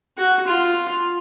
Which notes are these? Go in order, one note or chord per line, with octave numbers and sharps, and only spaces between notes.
F#4
F4